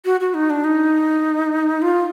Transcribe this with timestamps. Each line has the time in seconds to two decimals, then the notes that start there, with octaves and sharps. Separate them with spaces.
0.05 F#4
0.21 F#4
0.34 D#4
0.50 D4
0.64 D#4
1.82 F4